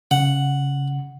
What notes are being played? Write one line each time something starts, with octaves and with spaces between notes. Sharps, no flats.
C#3 F#5